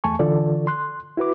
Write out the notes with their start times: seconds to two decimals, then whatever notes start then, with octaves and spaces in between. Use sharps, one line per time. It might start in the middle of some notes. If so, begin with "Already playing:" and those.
0.04 E2 A3 G#5 A5 C#6
0.19 D3 E3 F4 A4 D5
0.67 C6 F#6
1.17 E4 F#4 B4 D6